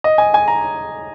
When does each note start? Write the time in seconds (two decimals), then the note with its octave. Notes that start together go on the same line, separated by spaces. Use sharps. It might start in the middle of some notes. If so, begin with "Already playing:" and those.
0.04 D#5
0.18 G#5
0.34 G#5
0.48 A#5